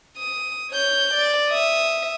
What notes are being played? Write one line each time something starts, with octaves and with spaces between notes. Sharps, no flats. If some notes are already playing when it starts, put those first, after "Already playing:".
D#6
C#5 G6
D5
E5 D#6